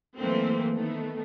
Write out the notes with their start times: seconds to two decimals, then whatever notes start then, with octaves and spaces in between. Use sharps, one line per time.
0.16 E3 F#3 A3 A#3 C4
0.74 D#3 A3 B3